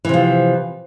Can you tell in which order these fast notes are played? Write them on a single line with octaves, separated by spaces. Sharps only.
E3 C3 F3